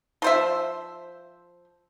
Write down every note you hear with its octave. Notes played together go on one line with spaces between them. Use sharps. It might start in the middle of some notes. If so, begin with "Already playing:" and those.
F3 C5 E5